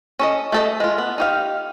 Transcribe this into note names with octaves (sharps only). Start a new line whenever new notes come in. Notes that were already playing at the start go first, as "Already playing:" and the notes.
C#4 A4 D#5
A3 A4 D#5
G#3 F4
B3
D#4 G4 F5